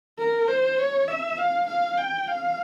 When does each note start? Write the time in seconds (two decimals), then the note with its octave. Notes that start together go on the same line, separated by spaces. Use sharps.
0.18 A#4
0.48 C5
0.78 C#5
1.08 E5
1.38 F5
1.67 F5
1.98 G5
2.27 F5